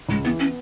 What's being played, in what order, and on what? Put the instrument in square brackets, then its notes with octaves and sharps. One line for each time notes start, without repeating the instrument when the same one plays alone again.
[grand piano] C#2 [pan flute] G#3
[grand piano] E3 [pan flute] B3
[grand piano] B3 [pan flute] C#4